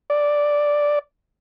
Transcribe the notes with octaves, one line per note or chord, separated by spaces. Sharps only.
D5